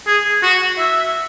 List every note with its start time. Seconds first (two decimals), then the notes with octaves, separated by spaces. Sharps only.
0.07 G#4
0.43 F#4
0.78 E5